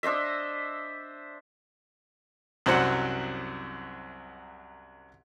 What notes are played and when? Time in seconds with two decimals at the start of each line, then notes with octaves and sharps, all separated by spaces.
0.03 D4 C5 D#5 E5
2.66 C2 F#2 F#3 C5 F#5